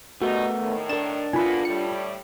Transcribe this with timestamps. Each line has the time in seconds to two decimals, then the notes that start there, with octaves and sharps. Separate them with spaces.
0.22 B2 G3 A3 B3 D#4 F#4
0.59 A2 D#3
0.89 D4 A#4 E7
1.33 A2 A#3 B3 F4 G#5 B5
1.65 A2 G3 C#7